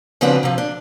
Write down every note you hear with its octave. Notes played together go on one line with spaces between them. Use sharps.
C#3 F3 C4 D4 F#4 B4
C3 F3
D4